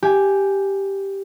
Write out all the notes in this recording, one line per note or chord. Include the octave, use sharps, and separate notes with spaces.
G4 G#5